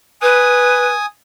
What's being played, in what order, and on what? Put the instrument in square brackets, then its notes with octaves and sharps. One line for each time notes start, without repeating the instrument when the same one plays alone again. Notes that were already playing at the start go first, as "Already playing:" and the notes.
[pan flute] B4 [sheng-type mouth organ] G#5 D#6